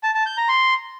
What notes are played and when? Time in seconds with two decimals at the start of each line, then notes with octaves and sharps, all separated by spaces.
0.03 A5
0.15 A5
0.26 G6
0.37 A#5
0.49 C6